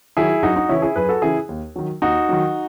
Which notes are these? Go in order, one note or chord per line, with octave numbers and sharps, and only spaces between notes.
D#3 F#3 E4 G#4
F#2 D#4 F#4
D#4 F#4
C#3 E3 C#4 E4
E4 G#4
F#2 G#4 B4
F#4 A4
C#3 E3 E4 G#4
D#2
D#3 F#3
D#2 D#4 F#4
D#3 F#3